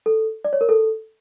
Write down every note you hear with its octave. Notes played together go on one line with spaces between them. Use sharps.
A4
D5
C#5
A#4
A4